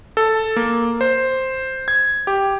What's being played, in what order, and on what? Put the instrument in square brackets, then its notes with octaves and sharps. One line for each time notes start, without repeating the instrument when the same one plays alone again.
[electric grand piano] A4
A#3
C5
G#6
G4